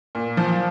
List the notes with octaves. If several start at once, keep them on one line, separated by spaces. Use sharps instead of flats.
A#2
F3